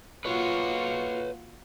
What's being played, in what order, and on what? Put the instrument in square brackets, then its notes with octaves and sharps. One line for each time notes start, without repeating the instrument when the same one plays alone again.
[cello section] A#3 F4 F#4 [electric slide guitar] B4 C#5